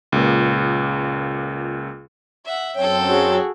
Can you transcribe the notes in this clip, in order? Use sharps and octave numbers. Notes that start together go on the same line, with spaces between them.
C#2 A#2
E5 F#5
F#2 F#3 C4 A4 C#5 G5
F#4 G#4 C#5